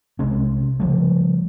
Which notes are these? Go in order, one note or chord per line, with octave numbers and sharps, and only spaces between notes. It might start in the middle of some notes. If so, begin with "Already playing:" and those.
C2 C3 G#3 C#4
C#3 F3 G3 A3